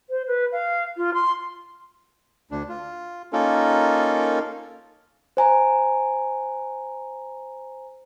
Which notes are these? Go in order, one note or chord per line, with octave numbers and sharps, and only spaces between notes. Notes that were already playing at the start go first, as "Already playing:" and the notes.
C5
B4
F5
F4
C6
D2 D4
F4
A#3 C#4 D#4 F4 A4 A#4
C5 G#5 A#5